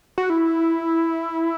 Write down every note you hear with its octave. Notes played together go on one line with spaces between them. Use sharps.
F#4
E4